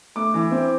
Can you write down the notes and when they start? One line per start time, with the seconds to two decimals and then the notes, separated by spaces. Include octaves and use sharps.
0.16 A3 D6
0.34 E3
0.51 C4